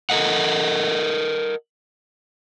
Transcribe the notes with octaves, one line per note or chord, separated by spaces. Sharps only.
A4 A#4 D#5 F#5